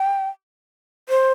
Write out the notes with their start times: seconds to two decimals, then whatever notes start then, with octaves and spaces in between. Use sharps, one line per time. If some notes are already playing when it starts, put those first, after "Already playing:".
Already playing: G5
1.09 C5